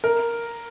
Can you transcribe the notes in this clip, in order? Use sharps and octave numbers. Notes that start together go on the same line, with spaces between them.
A#4